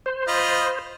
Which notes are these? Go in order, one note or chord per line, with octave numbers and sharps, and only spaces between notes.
C5
F4 D#5 B5